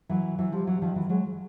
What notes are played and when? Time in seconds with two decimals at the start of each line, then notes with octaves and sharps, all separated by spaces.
0.09 E3 F#3
0.38 E3 F#3
0.52 F3 G3
0.67 E3 F#3
0.82 D#3 F3
0.96 E3 F#3
1.09 F#3 G#3